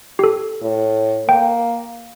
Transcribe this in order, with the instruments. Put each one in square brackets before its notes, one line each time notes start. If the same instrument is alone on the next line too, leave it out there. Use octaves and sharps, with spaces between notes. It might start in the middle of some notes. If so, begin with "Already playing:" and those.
[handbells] G4 A4
[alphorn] A2
[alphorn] A#3 [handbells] G5